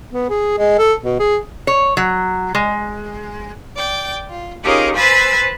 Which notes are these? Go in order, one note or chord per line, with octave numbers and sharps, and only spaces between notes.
B3
G#4
G#3
A4
B2
G#4
C#5
F#3
G#3
D5 G5
F4
C#4 D#4 F4 G4 G#4 A#4
B4 C5 G#5 B5 E6 A6